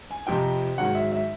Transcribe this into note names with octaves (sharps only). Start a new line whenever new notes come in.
G#5
F2 C3 F3 G5
G#2 D#3 F#3 F#5
E5
E5